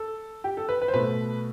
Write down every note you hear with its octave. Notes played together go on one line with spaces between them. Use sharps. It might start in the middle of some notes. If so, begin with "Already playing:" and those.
Already playing: A4
G4
A4
B4
B4
C5
B2 A3 B4